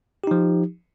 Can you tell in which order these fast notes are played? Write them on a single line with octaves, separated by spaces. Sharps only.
G4 D#4 F3